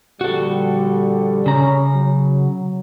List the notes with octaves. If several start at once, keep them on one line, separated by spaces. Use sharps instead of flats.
A#1 D3 G3 F#4 A4
C#3 C#4 A#5
F#3